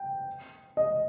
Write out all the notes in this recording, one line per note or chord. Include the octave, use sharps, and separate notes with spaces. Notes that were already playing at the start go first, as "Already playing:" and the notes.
Already playing: G5
D#5